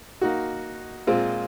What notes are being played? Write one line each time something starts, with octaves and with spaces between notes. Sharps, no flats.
A#3 D#4 F#4
A#2 G#3 C4 F4 C5